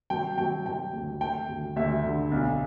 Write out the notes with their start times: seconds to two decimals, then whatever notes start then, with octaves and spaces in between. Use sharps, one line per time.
0.10 F#3 G5
0.38 F#3 G5
0.66 F#3 G5
0.93 D2
1.21 A3 G5
1.49 D2
1.76 D2 E5
2.03 D3
2.32 B1